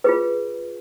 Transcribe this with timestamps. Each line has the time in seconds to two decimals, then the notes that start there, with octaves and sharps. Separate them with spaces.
0.04 F4 G#4 B4